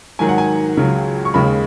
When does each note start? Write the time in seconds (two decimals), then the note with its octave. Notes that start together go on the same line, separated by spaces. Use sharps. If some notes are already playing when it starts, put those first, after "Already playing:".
0.19 G#2 D#3 F#3 G#5
0.29 F#5
0.38 G#5
0.77 C#2 C#3 F#3
1.25 C#6
1.34 D#2 C#3 G#3 B5